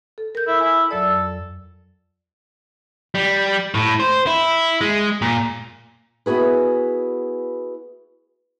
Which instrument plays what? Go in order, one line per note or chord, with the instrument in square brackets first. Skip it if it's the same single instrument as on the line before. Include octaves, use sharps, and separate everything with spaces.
[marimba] A4
A#4 G6
[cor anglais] E4
[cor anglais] E4 [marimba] G#5
[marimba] F2 F#3 D5 [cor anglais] A4
[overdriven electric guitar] G3
A2
C5
E4
G#3
A#2
[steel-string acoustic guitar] B3 E4 F#4 G#4 B4